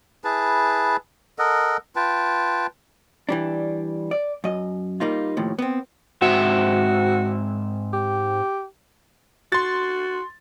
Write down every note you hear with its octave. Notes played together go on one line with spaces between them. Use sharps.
E4 G#4 B4 A5
A4 A#4 D#5 F#5
F4 B4 G5 A5
E3 G3 D4
D5
F#2 D#5
G3 A#3 D#4 F4
D#2 A2 F3
B3 C4
G#2 C4 F#4 E5
G4
F#4 C6 A6